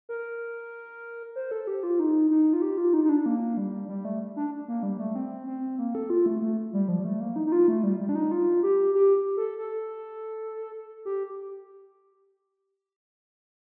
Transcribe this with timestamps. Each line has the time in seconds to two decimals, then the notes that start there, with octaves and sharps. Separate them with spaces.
0.09 A#4
1.36 C5
1.51 A4
1.67 G4
1.83 F4
2.00 D#4
2.31 D#4
2.53 F4
2.62 G4
2.77 F4
2.93 D#4
3.04 D#4
3.09 D4
3.26 A#3
3.57 G3
3.88 G3
4.05 A3
4.36 D4
4.68 A#3
4.83 G3
4.99 A3
5.15 C4
5.47 C4
5.78 A#3
5.95 A4
6.10 F4
6.26 A3
6.42 A3
6.73 G3
6.89 F3
7.00 G3
7.05 A3
7.20 A#3
7.36 D#4
7.46 D#4
7.52 F4
7.68 A3
7.84 G3
8.00 G3
8.09 D4
8.15 D#4
8.32 F4
8.63 G4
8.94 G4
9.37 A4
9.58 A4
11.05 G4